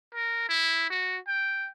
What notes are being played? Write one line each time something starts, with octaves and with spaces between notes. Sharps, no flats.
A#4
E4
F#4
G5